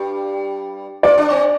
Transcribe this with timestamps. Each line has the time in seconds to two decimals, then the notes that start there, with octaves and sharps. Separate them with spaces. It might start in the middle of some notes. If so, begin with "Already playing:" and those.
Already playing: G2 G3
1.03 F4 D5
1.18 D4
1.30 C4